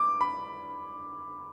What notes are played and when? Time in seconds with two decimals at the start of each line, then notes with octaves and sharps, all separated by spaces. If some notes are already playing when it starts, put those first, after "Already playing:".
Already playing: D6
0.21 B5